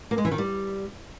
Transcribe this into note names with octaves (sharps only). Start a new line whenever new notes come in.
A#3
G#3
E3
D#3
G3